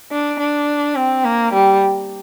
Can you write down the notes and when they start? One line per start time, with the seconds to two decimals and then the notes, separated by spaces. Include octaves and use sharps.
0.11 D4
0.39 D4
0.95 C4
1.24 A#3
1.53 G3